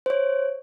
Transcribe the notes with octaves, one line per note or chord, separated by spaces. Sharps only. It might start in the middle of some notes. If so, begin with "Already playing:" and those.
C5
C#5